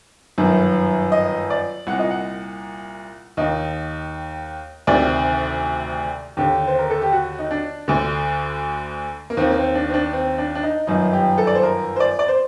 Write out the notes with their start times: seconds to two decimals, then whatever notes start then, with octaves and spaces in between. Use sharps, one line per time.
0.38 G1 F#2 D#3
1.12 D#5
1.50 D5
1.87 C2 A#2 F#5
1.99 D#5
2.11 F#5
3.37 D#2 D#3 D#5
4.87 D2 C3 D#3 D5
6.37 D#2 D3 G4
6.67 C5
6.79 A#4
6.90 A4
7.02 G4
7.12 F#4
7.39 D#4
7.51 D4
7.88 D2 D3
9.30 A#3
9.37 D#2 D#3 C4
9.50 A#3
9.57 C4
9.75 D4
9.89 C4
9.94 D4
10.13 C4
10.38 D4
10.55 D4
10.63 D#4
10.87 G1 F#2 D#3 D#4
11.13 G4
11.38 A4
11.47 D5
11.55 C5
11.63 A#4
11.96 C5
12.00 D5
12.19 D5
12.28 C5